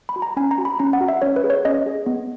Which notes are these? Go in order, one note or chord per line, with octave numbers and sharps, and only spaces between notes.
B5
F#4
A#5
C#4 G#5
A#5
F#4
B5
C#4 A#5
F#5
F#4
E5
C#4 C#5
B4
G#4
C#5
C#4 D#5
G#4
B3